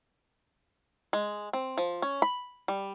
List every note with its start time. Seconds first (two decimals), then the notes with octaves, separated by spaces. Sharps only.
1.13 G#3
1.53 C4
1.78 F3
2.02 C#4
2.22 B5
2.68 G3